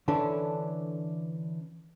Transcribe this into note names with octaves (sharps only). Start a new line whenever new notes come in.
D3 E3 C#4 D4 A4